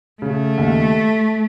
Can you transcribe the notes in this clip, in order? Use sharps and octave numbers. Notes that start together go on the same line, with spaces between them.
C#3 A3
D#2